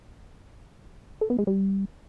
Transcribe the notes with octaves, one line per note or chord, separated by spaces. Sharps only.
A4
B3
G#3
G3